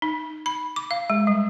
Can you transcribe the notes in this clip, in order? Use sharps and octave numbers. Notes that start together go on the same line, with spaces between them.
D#4
B5
D6
F5
G#3
G3